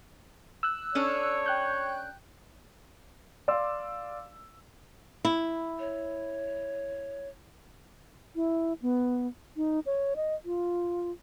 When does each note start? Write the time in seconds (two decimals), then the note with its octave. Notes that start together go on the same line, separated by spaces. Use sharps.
0.63 E6 F#6
0.95 C#4 D4 A4 C#5
1.46 G5 F#6 G6
3.48 D5 F5 C6 D6 E6
5.25 E4
5.79 C#5
8.35 E4
8.82 B3
9.57 D#4
9.86 C#5
10.16 D#5
10.45 F4